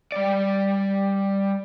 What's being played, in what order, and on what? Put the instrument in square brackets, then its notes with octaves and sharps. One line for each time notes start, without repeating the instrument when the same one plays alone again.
[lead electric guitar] G3 D5